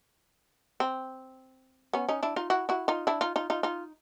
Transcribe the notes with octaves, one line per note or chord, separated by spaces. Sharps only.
C4
B3 C#4
C#4 D#4
D4 E4
D#4 F4
E4 F#4
E4 F#4
D#4 F4
D4 E4
D#4 F4
D#4 F4
D#4 F4
D#4 F4